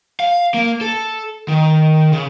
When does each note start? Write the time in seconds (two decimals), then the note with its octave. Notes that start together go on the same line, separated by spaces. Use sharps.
0.20 F5
0.54 A#3
0.81 A4
1.48 D#3
2.13 C#3